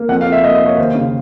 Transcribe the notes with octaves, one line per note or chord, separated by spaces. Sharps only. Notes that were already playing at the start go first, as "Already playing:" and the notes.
Already playing: A#3
F2 F#5
F5
F2
E5
A#3 D#5
A#3 C#5
D#2 C5
C#3